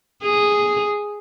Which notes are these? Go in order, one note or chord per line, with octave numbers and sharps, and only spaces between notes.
G#4